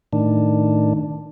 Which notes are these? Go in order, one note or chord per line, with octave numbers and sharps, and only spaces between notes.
A2 D#3 D4